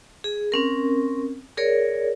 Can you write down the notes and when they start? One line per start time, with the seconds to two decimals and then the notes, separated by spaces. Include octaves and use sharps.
0.24 G#4
0.52 C4 C#4 A#4
1.57 G#4 A#4 C#5 D5